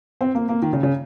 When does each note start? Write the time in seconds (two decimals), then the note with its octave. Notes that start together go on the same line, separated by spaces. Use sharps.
0.21 C4
0.35 A#3
0.49 A#3
0.62 D#3
0.73 C#3
0.83 C#3